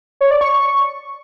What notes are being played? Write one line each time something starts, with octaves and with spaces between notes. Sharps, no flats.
C#5
D5
C#6